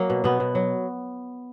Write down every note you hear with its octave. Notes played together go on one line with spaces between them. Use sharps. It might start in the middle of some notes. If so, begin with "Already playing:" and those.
Already playing: F#3 A#3
B2
B2 B3
B2
F#3